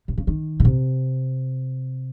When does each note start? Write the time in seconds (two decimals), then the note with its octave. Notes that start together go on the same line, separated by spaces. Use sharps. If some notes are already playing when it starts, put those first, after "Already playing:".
0.08 C3
0.18 C#3
0.27 D#3
0.60 C#3
0.65 C3